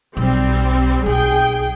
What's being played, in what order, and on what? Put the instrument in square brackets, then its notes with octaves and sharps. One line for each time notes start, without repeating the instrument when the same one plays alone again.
[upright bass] B1 [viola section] G3 C4
[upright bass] B1 [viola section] G#4 G5